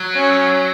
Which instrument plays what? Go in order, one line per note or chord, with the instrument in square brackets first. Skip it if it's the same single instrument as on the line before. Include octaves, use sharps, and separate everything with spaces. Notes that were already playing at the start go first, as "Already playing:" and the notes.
Already playing: [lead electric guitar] F#3
[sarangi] C#4